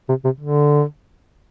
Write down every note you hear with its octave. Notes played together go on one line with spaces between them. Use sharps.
C3
C3
D3